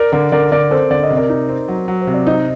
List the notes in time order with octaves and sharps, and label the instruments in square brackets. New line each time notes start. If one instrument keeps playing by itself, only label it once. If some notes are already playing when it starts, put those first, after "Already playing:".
Already playing: [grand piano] A#4 D5
[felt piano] D3 [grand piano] A#4 D5
[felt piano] D3 [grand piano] A#4 D5
[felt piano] D3 [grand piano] A#4 D5
[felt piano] C4 [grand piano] A4 C5
[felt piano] D3 [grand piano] D5
[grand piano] D#5
[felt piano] C3
[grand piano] A#4 D5
[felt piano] D#4
C4
F#3
F#3
[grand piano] C5
[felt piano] C3
[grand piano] D5
[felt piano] D#4 [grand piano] C5 D#5